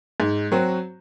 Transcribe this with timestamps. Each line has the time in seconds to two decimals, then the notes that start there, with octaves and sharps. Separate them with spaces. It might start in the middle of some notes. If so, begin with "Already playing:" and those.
0.20 G#2
0.52 F#3 C4 F#4